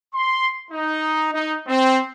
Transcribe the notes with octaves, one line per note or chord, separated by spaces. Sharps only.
C6
D#4
D#4
C4